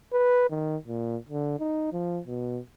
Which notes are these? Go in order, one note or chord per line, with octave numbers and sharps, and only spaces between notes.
B4
D#3
A#2
D3
D#4
F3
B2